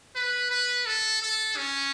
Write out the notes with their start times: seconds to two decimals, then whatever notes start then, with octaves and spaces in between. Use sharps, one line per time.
0.16 B4
0.50 B4
0.86 A4
1.22 A4
1.57 C#4